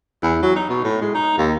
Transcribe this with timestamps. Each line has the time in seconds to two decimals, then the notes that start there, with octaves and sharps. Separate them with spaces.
0.23 E2
0.43 F#3
0.56 D#4
0.69 B2
0.84 A2
1.01 G#3
1.15 D#4
1.38 D#2